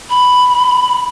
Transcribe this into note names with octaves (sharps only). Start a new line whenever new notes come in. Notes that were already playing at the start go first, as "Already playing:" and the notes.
B5